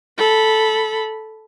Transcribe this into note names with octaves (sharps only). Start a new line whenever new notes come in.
A4 B5